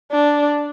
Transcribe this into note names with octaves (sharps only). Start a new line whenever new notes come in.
D4